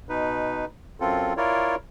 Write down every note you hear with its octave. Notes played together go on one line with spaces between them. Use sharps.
B2 D#4 B4
F#2 C4 F4 A4
E4 F4 A#4 C#5 D5